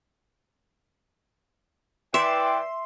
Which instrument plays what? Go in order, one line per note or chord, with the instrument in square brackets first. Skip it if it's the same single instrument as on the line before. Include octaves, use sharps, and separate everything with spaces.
[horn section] E3 G5 [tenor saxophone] D5 [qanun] E5 [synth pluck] C6